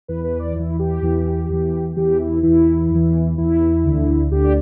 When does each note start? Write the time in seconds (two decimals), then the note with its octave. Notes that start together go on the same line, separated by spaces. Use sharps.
0.08 E2 E3 B4
0.24 B4
0.39 D5
0.55 E2 E3 E4
0.79 G4
1.02 E2 E3
1.49 E2 E3
1.96 E2 E3 G4
2.20 E4
2.43 E2 E3 E4
2.91 E2 E3
3.38 E2 E3 E4
3.85 D2 D3
4.31 D2 D3 G4
4.44 D5